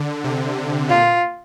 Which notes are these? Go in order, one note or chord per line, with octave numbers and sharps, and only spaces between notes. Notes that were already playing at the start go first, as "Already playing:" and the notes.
Already playing: D3
C3
A#2 F4